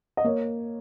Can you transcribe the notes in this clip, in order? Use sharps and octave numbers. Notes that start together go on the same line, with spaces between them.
D#5
A#3 C#5